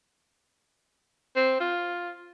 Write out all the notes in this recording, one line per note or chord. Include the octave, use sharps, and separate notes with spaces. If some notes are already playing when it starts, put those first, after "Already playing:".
C4
F4